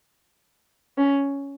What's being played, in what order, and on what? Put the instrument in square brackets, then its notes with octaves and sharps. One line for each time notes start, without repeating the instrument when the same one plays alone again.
[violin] C#4